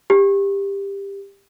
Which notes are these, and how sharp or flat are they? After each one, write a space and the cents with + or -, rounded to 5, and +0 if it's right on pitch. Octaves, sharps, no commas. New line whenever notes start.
G4 +15